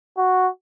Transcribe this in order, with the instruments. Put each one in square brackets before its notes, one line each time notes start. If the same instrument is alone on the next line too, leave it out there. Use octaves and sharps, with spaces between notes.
[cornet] F#4